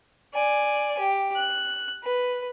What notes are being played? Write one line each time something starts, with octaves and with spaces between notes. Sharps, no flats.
D5 G#5
G4
F#6
B4